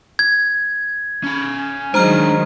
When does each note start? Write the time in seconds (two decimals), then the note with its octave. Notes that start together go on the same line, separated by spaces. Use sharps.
0.19 G#6
1.24 C#4 B5
1.94 D#3 F#3 G#3 D4 G#4 C5 A#5 F6